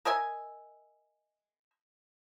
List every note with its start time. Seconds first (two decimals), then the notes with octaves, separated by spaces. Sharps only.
0.05 A#4 D#5 E5 G#5